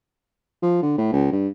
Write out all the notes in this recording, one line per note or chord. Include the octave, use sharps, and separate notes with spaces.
F3
D3
A2
C#2
G2